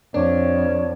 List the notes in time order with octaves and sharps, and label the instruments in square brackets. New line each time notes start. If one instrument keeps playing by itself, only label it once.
[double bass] F2 [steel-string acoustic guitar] D4 [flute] C#5